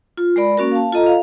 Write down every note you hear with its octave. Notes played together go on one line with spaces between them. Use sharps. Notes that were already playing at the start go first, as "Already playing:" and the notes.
F4
G#3 A#4 D5 B5
A#3 C#4 F#4 A#4
F5 A5
F4 A4 D#5 A#5
F5